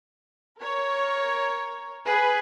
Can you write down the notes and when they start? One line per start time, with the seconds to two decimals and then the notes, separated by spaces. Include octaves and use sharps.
0.60 A#4 C#5
2.08 G#4 B4